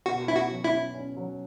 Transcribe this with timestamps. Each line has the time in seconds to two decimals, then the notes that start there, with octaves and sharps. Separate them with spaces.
0.06 B2 F#4
0.28 C#4 E4
0.35 F#4
0.51 F#3
0.64 E4
0.72 C#4
0.95 C#4
1.17 F#3